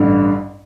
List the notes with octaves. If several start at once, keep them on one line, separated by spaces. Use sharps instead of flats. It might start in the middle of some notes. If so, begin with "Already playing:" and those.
Already playing: A1 G2 D3